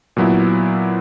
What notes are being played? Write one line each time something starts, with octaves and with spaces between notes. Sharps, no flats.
A#2 F#3 B3 E4